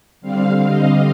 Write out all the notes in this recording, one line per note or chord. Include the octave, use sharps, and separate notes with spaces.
D3 G3 C4 F5
D#5